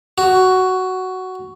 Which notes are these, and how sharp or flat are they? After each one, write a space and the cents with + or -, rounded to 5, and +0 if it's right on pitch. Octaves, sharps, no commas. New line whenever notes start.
F#4 +10